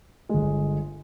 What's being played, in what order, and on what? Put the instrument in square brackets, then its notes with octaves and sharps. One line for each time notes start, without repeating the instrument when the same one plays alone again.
[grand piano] G1 G#3